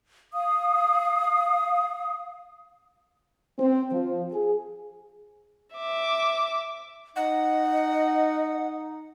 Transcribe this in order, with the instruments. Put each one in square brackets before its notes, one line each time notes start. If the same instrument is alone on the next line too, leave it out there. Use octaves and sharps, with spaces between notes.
[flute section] F5 D#6
[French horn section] C4
F3
G#4
[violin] E5 D6
[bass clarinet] D#4 [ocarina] D#5 [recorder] F#5